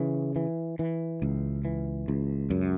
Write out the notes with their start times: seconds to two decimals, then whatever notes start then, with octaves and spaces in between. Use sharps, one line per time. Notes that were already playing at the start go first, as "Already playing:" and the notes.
Already playing: C#3 E3
0.36 E3
0.79 E3
1.22 C#2
1.65 E3
2.08 C#2
2.50 F#2